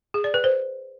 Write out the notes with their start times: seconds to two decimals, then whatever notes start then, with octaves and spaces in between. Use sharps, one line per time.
0.14 G#4
0.24 D5
0.34 B4
0.44 C5